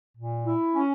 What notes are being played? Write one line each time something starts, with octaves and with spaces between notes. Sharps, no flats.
A#2
E4
C#4